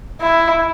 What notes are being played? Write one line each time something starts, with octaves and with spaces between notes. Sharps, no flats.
E4